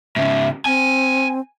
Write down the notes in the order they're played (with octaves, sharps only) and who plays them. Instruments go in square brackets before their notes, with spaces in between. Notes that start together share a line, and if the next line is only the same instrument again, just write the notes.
[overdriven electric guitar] G#2 C#3 [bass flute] E5
[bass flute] C4 [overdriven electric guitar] G#5